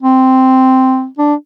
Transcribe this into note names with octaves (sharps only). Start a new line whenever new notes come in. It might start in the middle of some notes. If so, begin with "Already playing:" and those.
C4
D4